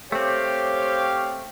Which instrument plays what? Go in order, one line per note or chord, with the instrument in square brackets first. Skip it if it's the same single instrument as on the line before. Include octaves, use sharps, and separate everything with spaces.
[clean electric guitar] A3 C4 [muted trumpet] G4 [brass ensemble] C5 C#5 F5